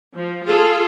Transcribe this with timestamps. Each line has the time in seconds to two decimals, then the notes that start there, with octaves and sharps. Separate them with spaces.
0.14 F3
0.45 F4 G#4 A4